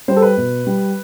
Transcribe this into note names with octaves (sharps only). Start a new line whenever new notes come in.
G3 C5
A4
B4
B2
G3